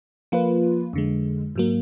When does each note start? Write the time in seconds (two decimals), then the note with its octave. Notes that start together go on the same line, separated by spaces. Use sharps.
0.32 F3 A#3 F4 B4
0.93 F2 D3 G#3
1.56 G#2 F#3 A#3